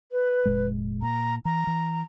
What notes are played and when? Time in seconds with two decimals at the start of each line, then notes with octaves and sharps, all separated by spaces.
0.12 B4
0.45 F1 A#2 G#3
1.02 A#2 A#5
1.45 E3 A#5
1.67 E3